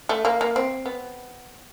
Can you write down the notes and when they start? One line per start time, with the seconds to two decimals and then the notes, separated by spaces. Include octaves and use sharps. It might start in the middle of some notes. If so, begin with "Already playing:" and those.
0.09 A3
0.25 A#3
0.41 A#3
0.56 C4
0.86 B3